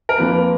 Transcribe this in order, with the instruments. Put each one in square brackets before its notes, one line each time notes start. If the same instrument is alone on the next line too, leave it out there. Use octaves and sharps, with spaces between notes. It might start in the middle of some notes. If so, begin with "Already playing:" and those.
[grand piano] A#4
F2 F3 A#3 F4 B4